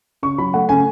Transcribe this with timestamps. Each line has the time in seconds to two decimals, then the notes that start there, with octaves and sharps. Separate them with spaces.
0.23 C#3 C#6
0.38 F#3 B5
0.54 A3 F#5
0.69 C#3 G#5